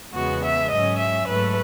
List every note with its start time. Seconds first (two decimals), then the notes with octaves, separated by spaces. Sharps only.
0.13 E2 C#3 G#3 B3 F#4
0.42 E5
0.69 G#2 F#3 C#4 D#5
0.98 E5
1.26 G#2 F#3 A3 B4